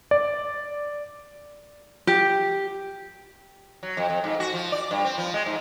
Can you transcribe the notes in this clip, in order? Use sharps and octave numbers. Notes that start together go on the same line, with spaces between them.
D5
G4
F#3
F2
F2
G#2
F#4
F3
D5
G2
C4
F3
G#3
G#2